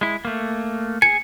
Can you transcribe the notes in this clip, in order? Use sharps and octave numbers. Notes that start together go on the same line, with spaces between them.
G#3 E4
A3 A#3
G#4 G#5 C#7